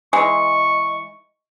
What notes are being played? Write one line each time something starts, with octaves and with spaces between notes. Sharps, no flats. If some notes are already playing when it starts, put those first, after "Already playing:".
E3 G#3 C#6